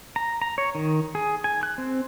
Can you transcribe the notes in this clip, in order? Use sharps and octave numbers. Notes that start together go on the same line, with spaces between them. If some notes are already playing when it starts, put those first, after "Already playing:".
A#5
A#5
C#5
D#3
G#4
G#5
F#6
C4